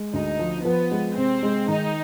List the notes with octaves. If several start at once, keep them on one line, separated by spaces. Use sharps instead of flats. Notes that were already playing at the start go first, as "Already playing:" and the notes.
Already playing: G#3
D2 D#4
F3
F3 B3
G#3
C3 C4
G#3
D#3 D#4